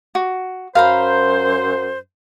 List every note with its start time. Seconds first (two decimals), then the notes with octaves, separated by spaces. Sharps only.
0.15 F#4
0.75 F#2 C5 F5 A#5 B5